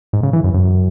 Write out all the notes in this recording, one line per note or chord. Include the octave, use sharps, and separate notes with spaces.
G#2
C#3
E3
F#2
F#2